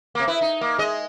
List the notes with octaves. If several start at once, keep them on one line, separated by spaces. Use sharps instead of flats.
C3 A#3
E4 B4
D#4
A#3
G#3 D#5